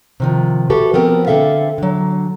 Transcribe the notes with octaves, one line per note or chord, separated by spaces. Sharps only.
C3 D#3 F3
F#4 G4 A4 B4 E5
F3 B3 C4 A#4
D3 C4 A4 E5 F5
D3 F#3